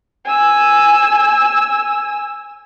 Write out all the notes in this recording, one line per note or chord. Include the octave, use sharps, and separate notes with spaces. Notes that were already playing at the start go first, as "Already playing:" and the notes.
G#5 E6